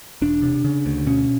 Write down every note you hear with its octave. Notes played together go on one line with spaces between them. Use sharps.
E1 D4
C3
C#3
D2
B2 C#4